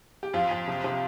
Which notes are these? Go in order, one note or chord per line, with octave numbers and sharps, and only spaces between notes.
G4
F2 F4
F2
C3
C3